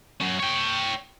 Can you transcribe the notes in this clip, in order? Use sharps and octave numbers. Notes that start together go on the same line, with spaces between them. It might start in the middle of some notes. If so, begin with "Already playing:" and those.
F#3 C#4
C#5 G5